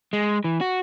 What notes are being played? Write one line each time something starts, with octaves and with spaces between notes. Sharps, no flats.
G#3
E3
F#4